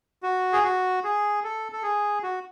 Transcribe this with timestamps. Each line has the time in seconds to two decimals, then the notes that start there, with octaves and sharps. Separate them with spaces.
0.23 F#4
0.53 G#4
0.64 F#4
1.04 G#4
1.44 A4
1.72 A4
1.83 G#4
2.23 F#4